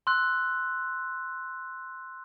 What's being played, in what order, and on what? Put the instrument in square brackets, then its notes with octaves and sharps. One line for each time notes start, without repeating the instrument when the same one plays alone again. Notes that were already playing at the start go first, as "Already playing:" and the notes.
[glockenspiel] C6 E6 F#6